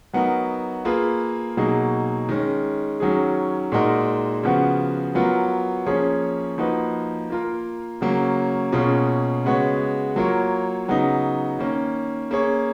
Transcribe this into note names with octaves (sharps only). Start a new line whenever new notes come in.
F#3 B3 D#4 F#4 A#4
A#3 F4 G#4 B4
B2 F#3 A#3 D#4 G#4
D#3 G#3 C#4
D#3 F#3 C#4 G#4
A#2 G#3 D#4 F#4 A#4
C#3 F3 B3 F#4
F#3 B3 F4 A#4
F3 A#3 C#4 G#4 C#5
F3 A#3 D#4 F#4 B4
A#3 F4 A#4
C#3 F#3 A#3 C#4
B2 A#3 C#4 F4 G#4
C#3 G#3 B3 F#4 C#5
F#3 A#3 F4 A#4 C#5
C#3 F#3 B3 D#4
D#3 A#3 C#4
A#3 C#4 G#4 C#5